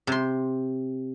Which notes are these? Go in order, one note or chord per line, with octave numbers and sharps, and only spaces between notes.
C3 C6